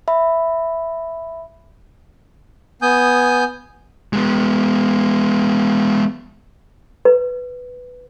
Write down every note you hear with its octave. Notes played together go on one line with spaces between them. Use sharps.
E5 B5
B3 G#5 D#6 G6
G#3 B3
B4